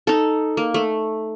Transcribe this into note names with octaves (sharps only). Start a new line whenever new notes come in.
D#4 A4
A#3
A3